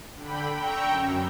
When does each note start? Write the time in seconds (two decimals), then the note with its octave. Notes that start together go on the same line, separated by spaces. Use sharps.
0.16 D3 G5 B5
0.55 G5 A#5 C#6 E6
0.86 F#2